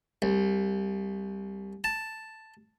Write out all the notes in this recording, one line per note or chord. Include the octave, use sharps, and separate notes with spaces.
C2
A5